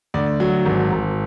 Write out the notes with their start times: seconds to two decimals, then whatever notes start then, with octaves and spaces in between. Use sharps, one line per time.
0.14 D2 D5
0.40 F#3
0.65 G#1
0.92 G#1